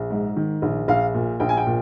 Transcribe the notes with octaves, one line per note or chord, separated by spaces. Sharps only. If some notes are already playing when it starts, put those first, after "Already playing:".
Already playing: A#1
G#2
D#3
A#1
A#1 F5
A#2
A#1 G5
G#5
G5
A#2